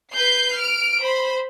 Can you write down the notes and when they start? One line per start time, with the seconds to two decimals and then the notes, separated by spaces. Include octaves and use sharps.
0.14 B4 G6 C7
0.58 F6 D7
1.00 C5 B5